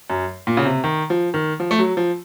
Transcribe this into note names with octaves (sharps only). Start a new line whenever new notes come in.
F#2
A#2
C#3
C3
D#3
F3
D#3
F3
A3
F#3
F3